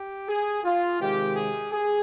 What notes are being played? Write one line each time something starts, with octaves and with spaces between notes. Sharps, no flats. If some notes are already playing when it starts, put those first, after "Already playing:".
Already playing: G4
G#4
F4
C3 D#3 G#3 G4
G#4
G#4